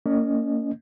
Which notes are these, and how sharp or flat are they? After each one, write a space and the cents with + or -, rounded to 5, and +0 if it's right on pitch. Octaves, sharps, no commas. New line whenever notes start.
A#3 -25 C#4 +25 D#5 -15